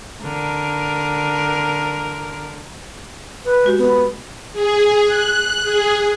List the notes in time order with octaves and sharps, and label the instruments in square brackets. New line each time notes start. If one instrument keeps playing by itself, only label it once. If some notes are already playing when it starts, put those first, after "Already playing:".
[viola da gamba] D3 A#4
[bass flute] B4
[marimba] G#3 F#4 G4
[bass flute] B3
[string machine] G#4
F#6
G#4